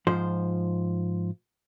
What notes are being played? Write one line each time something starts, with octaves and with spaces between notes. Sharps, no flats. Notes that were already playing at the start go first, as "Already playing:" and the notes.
G#2 F3 C5